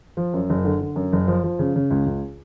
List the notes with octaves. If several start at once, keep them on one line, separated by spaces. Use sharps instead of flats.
F3
F#2
F#1
D3
D3
F#2
F#1
F3
F3
C#3
C#3
C#2
C#2